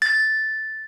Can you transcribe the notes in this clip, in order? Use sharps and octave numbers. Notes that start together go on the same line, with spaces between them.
A6